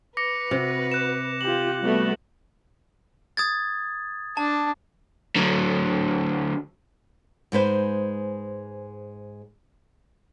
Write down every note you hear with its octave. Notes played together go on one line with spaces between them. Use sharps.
B4 D6 A#6 C#7
C3 F#4
F#6 E7
F4 G4 F#7
G3 A3 B3 F#4
D#6 G#6 A6
D4 A5
D3 F#3
G#2 G#3 B4 C5